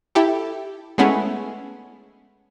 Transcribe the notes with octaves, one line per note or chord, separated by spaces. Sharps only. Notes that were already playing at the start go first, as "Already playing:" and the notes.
E4 G4 A4
G#3 A3 B3 C#4 E4 G#4